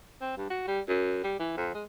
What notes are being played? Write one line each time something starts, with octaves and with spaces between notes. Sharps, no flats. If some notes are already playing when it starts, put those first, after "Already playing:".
C4
G2
F#4
G3
F#2
G3
E3
F2
G#3